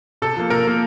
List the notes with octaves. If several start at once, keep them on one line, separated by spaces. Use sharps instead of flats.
C3 A4
F3 A#3
C3 A#4
F3 A#3